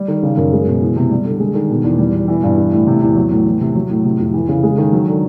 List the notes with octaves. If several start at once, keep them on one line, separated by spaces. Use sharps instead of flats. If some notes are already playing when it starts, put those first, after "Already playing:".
Already playing: G3
D#3
C#3
F#2
G#3
B2
E3
C3
G3
D3
G#3
D#3
B2
E2
G3
B2
E3
G2
E3
A2
C3
E2
F#3
A2
E3
C3
F#3
A2
C3
F2
E3
C#3
G#3
D#3
F#3
D3